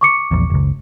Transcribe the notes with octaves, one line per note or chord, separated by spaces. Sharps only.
C#6 D6 C#7
A#1 E2
F#1 C#2